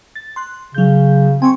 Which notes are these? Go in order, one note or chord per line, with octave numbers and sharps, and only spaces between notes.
A6
C6 F#6
C#3 F#3 G6
C4 G#5 C6 C#6